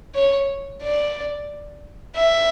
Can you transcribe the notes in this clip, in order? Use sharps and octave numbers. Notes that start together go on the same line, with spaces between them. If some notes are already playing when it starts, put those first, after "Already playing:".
C#5
D5
E5